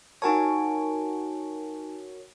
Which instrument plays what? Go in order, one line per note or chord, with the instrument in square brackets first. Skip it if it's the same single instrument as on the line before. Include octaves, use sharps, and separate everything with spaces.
[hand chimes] D#4 G#5 A5 [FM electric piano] F#4 A#4 C#5